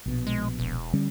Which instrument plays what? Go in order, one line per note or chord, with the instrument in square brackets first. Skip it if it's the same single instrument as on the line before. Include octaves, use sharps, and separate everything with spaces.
[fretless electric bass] A#1 B2
[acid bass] G#3
E1
[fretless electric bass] D3 G3 C#4